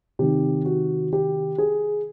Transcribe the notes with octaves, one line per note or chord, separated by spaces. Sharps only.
C3 D#3 G4
F#4
G4
G#4